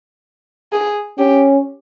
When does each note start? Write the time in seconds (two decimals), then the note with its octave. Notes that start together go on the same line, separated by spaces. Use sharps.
0.73 G#4
1.19 C#4 G4